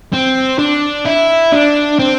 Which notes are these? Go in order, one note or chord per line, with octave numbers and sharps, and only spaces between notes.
C4
D4
E4
D4
C4